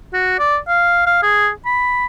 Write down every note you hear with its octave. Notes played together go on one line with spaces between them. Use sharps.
F#4
D5
F5
F5
G#4
B5